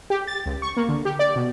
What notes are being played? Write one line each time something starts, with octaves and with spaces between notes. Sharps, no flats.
G4
A6
C#2
C#6
A#3
D3
G4
D5
B2